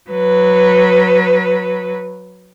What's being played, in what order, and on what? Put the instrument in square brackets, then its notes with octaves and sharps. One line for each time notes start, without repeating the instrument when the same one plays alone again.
[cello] F#3 B4